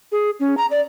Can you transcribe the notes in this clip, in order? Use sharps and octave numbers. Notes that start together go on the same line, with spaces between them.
G#4
C#4
A#5
D5